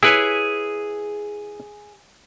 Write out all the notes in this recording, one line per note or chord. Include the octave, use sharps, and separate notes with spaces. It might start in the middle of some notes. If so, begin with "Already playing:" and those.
E4 G#4 B4 C#5